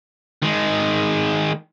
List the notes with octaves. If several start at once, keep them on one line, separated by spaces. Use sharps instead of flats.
D#3 G#3